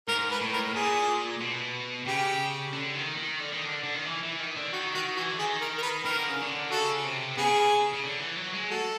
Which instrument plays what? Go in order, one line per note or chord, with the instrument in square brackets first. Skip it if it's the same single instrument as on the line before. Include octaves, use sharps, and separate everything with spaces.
[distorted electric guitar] G#2 [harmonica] A#4
[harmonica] B4
[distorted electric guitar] A2
[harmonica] A#4
[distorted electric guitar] A#2 [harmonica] G#4
[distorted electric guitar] B2
[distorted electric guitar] C#3 [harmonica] G4
[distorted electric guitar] D3
D#3
D#3
D3
D#3
D3
D3
D#3
E3
E3
D#3
D3
[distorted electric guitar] D#3 [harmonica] F#4
[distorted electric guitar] D#3 [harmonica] F#4
[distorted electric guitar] E3 [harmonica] F#4
[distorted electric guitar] D3
[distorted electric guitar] D#3 [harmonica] G#4
[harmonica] A#4
A#4
B4
[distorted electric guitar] D#3 [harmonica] A#4
[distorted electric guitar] D3
C#3
D3
[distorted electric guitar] C#3 [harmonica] F#4 A4
[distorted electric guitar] C3
[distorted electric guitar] C#3 [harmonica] B3 G#4
[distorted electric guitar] C#3
D3
E3
F#3
G#3
[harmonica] F#4 A4